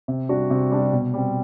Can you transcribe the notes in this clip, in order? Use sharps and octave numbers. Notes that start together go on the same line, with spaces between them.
C3
G3 D4 F#4
C3
G3 D4 F#4
B2
G3 C4